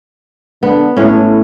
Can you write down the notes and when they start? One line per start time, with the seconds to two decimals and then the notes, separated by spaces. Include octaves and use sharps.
0.63 D3 B3
0.97 A2 C#4 A4